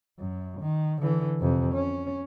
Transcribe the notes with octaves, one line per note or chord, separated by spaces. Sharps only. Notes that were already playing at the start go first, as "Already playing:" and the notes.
F#2
D#3
D3 E3
F2 C3
C#4